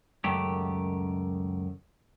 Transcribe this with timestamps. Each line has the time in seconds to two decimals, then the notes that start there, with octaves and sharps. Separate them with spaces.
0.24 C#2 F#2 D#3 A3 G4